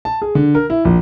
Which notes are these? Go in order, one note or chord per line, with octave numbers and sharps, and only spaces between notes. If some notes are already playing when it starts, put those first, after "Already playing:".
A5
G#4
D3
A#4
E4
A#1